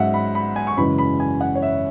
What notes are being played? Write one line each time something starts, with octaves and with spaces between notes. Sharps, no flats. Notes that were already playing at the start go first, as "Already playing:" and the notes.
Already playing: G#2 F#3 C#4 E5 F#5
B5
B5
G#5
C#6
F#2 C#3 E3 G#3 B5
B5
G#5
F#5
C#5
E5